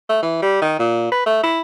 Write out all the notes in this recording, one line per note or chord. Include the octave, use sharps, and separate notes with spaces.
A3
E3
G3
D#3
A#2
B4
A3
E4